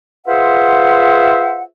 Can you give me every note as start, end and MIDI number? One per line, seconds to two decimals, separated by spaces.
0.27 1.63 65
0.27 1.63 68
0.27 1.63 71
0.27 1.63 72
0.27 1.63 76
0.27 1.63 78